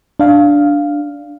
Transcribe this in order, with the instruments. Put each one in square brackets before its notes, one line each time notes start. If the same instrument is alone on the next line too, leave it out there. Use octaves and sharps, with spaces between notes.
[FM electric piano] D4 F5